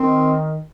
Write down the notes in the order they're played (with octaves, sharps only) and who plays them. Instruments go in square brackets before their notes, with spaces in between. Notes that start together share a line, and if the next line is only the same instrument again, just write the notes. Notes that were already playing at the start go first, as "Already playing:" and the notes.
Already playing: [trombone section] D#3 [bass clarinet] C4